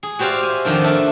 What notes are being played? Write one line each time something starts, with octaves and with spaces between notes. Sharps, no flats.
G#4
F#4 G4 C5 D5 E5 F5
G#5
F2 D#3 F3 D4
A3 D4 E5